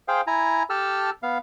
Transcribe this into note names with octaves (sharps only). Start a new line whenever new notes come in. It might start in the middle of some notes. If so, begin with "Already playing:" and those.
G#4 C5 F5 G5
E4 G#5 A#5
G4 A4 A5 E6 F6
B3 F5